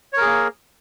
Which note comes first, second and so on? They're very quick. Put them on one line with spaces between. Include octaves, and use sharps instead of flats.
C#5 A#4 G#4 A#3